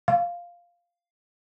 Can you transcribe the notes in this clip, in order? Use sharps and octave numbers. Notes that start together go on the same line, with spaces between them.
F5